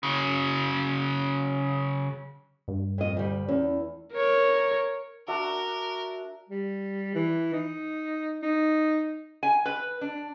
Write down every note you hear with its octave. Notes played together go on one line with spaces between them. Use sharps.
C#3 F#3
G2
F2 D#5
D2 G3
E2 C#4
A#4 C#5
D4 F#4 A#4 E5
G3
E3
D#4
D#4
G#5
B4
D4